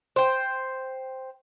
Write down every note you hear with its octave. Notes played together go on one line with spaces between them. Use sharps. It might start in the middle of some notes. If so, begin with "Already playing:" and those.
C5 G5